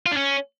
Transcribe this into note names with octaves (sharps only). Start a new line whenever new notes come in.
F4
D4
C#4